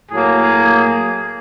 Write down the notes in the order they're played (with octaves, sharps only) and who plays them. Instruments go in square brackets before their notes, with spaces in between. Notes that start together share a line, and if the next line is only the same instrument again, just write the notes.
[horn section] A2 F#3 A#3 G#4